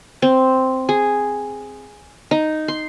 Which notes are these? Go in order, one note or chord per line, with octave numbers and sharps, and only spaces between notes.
C4
G#4
D#4
C6